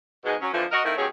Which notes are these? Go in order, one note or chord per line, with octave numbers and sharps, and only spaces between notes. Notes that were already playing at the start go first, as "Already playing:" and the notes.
G#2 B2 G#3
F#3 C#4
F2 D3 E3 F3
F#4 A#4 D#5
D#3 A3 A#3 C4 E4
B2 D#3 F#3 C#4 G4 G#4